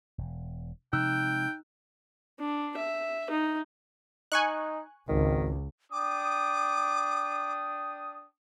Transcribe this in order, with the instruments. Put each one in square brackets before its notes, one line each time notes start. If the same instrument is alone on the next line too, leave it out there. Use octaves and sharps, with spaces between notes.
[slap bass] E1
[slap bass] C3 F3 G#3 [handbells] D#4 E6 F#6 [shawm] G5
[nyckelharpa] D4
E5
D#4
[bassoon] D#4 [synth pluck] G#5 C#6 F#6
[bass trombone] G#1 [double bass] C#2 [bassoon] D#3
[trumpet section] D4 G5 D#6 [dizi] D6